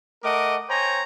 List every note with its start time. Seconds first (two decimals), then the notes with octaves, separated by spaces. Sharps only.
0.23 A3 A#4 D#5 F#5 D6
0.68 C5 C#5 G5 G#5 A#5